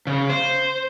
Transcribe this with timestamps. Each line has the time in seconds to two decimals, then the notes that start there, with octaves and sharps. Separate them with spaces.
0.07 C#3
0.29 C5